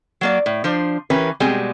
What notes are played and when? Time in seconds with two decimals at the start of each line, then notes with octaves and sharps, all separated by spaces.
0.21 F#3 A#3 D5
0.46 A2
0.64 F3 D4 C5
1.10 E3 C#4 G4 A#4 B4
1.40 B2 G3 G#3 C4 G#5